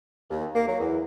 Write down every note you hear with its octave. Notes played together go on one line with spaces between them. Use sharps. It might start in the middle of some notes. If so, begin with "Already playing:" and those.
D#2
A#3
F#3
E2